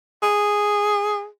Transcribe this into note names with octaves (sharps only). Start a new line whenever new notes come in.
G#4